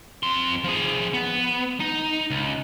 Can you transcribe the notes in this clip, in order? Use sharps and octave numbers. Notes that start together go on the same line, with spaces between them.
F2 C6
F3 G#4
B3
D#4
C#2